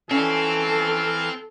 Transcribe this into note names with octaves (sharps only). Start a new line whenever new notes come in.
E3 C4 C#4 A4 F5 F6